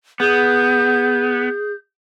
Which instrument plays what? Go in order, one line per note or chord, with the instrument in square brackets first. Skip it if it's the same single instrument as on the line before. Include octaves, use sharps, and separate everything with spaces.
[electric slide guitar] B3 [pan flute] G#4 [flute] G6